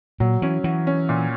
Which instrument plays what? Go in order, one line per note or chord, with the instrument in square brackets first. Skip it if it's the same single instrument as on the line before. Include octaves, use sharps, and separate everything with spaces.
[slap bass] A#2 [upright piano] F#3
[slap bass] E3 [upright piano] C#4
[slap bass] E3 [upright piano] F#4
[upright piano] C#4
A#2